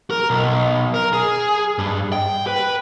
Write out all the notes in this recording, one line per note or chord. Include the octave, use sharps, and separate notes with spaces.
A#4
B1
A#4
G#4
G2
G5
B4